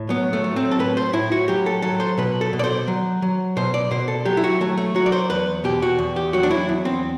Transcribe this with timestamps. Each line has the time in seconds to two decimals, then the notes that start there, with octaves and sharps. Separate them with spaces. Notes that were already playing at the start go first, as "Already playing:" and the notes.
Already playing: A2
0.09 F#3 B3
0.33 A3
0.44 F#3
0.56 C4
0.71 A4
0.79 A2 B4
0.97 C5
1.13 A2 E4
1.32 F#4
1.48 F#3 G4
1.66 A4
1.82 F#3 A4
2.00 C5
2.18 B2 B4
2.41 A4
2.53 B2
2.59 D5
2.64 C5
2.88 F#3
3.22 F#3
3.57 B2 C5
3.74 D5
3.91 B2 C5
4.08 A4
4.25 F#3 G4
4.37 E4
4.44 F#4
4.61 F#3 A3
4.78 A3
4.95 F#3 F#4
5.06 D5
5.12 C5
5.30 E2 B4
5.64 B2 G4
5.82 F#4
5.99 E2
6.16 G4
6.33 F#3 F#4
6.43 D4
6.51 E4
6.69 E2
6.85 C4